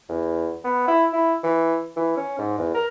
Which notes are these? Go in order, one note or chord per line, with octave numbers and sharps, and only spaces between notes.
E2
B3
E4
E4
E3
E3
C#4
G#2
E2
A#4